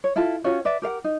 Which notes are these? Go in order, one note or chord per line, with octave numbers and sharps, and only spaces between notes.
C#5
E4 F4 A4 E5
C#4 F4 F#4 C#5
B4 D5 E5
G4 A#4 F5 F#5
D#4